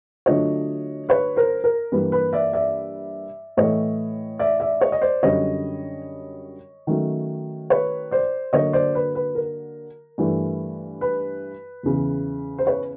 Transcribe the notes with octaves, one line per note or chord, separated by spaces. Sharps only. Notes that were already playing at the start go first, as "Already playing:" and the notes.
D3 F#3 A3 D4 F4 C#5 D#5
B4 C#5
A#4 C5
A#4
G2 E3 G3 A#3 B4
B4
D5 E5
D5 E5
A2 E3 A3 C#5 D#5
D5 E5
D5 E5
C#5 D#5
D#5
C5 D5
F#2 D3 G3 C#5 D#5
D#3 F#3 A3 C#4
B4 C#5
C5 D5
D3 F#3 A#3 C#5 D#5
C5 D5
B4
B4
A#4
G2 E3 A3
B4
E2 C#3 E3
C5
B4 C#5